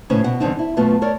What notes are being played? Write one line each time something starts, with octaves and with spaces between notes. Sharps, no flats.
A2 C#3 C#4 B4 C5
B2 F#5
E2 G2 D3 C4 D#4
E4
F#2 B2 A3 B3 F4 B4
A4 A#4 C#5 D5